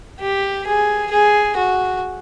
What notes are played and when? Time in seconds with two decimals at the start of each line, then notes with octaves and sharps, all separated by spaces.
0.20 G4
0.67 G#4
1.11 G#4
1.57 F#4